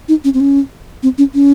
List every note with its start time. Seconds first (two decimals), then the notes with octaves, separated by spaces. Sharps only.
0.09 D#4
0.24 C#4
0.34 C4
0.40 C#4
1.03 C4
1.18 C#4
1.34 C#4